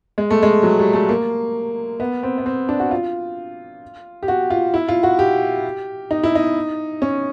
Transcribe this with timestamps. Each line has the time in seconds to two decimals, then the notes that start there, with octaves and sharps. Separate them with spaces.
0.18 G#3
0.31 A3
0.43 G#3
0.63 F#3
0.79 G3
0.93 A3
1.09 A#3
2.00 B3
2.23 C4
2.38 B3
2.46 C4
2.69 D4
2.80 F#4
2.91 F4
4.23 G4
4.28 F#4
4.50 F4
4.74 E4
4.89 F4
5.03 F#4
5.19 G4
6.11 D#4
6.23 E4
6.35 D#4
7.02 C#4